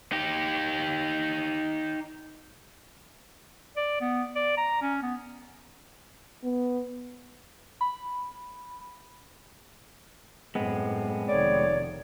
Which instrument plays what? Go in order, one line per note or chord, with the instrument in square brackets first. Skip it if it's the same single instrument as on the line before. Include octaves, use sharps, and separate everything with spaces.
[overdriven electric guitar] D#4 G4
[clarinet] D5
B3
D5
A#5
C#4
B3
[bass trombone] B3
[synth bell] B5
[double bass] F#2 A2 [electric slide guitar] G#3 B3 C4
[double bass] F1 D#3 [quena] C#5 [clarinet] D5